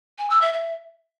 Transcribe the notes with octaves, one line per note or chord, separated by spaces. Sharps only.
G#5
E6
E5
E5